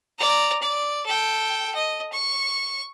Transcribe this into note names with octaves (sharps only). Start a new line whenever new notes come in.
D5 A#5
D5
A4 G5
D#5
C#6